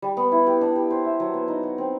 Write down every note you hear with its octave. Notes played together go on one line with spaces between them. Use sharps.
G3
B3
E4
G4
D4
G4
C5
E5
F#3
B3
D#4
F#4
C4